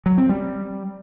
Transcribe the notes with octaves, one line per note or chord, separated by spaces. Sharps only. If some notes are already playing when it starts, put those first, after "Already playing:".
F#3
C4
G3